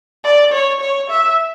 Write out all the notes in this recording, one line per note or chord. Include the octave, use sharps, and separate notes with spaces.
D5
C#5
C#5
E5